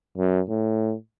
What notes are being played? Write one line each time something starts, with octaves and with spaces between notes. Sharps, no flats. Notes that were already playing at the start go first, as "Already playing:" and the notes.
F#2
A2